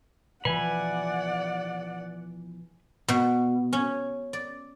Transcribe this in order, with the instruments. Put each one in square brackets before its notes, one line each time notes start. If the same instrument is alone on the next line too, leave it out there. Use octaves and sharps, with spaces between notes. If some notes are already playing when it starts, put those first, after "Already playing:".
[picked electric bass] B2 E3 F3 [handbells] B4 [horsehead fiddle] D5 F#5 [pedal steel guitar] G#5 B5
[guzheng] B2
C#4
D5